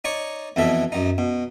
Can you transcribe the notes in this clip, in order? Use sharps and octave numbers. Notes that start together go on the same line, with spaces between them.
D#4 C#5 D5 C#6
F2 B2 E3 A4 E5
F#2 D#4
B2